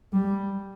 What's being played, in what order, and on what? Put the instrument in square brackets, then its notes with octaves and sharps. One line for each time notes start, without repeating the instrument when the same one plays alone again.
[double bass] G3